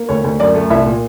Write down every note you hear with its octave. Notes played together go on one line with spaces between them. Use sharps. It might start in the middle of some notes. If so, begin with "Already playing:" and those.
Already playing: A#3
D2 C#5
D2
F#2 D5
A3
C2 E5
A#2